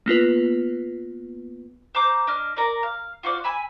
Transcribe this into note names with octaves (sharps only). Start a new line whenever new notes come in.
A#3 B3 F4 B4
C5 A#5 D6 G6
D4 D#5 F6
A#4 D5
F5
F4 F#4 C5 D5
G#5 B5 E6